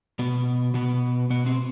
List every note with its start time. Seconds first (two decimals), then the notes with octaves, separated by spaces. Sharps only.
0.19 B2 B3
0.74 B2 B3
1.30 B2 B3
1.46 C4